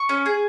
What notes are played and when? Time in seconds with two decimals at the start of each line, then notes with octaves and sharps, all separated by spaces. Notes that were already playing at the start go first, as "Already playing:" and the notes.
Already playing: C#6
0.09 C#4
0.26 G#4